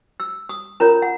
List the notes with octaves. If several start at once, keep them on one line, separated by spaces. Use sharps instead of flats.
E6
D#6
C#4 F4 A#4 C#5 A#5
F#5